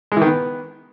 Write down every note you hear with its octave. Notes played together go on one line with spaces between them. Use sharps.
G#3
E3
D#3
B3